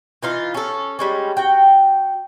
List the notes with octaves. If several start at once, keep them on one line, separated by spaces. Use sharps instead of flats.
E3 D#4 F4
C#4 A4
G3 G#3 C#4
F#4 G5